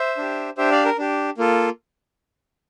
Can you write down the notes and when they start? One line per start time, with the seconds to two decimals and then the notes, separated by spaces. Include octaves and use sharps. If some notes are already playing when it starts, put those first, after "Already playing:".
Already playing: C5 E5
0.18 D4 G4
0.57 D4 G4 C5 E5
0.71 D5 F5
0.85 A#4
0.98 D4 G4
1.38 A#3 F4 A4